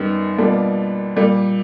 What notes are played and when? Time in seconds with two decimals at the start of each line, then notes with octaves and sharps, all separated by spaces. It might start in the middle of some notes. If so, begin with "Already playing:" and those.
Already playing: F#2 D#3 G3 B3
0.38 B2 G3 A#3 D4 F4
1.16 A#2 G3 A#3